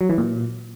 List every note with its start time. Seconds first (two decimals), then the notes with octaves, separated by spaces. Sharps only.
0.01 F#3
0.09 E3
0.18 A#2